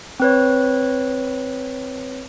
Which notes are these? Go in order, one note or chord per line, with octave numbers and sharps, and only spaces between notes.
C4 B4 C#5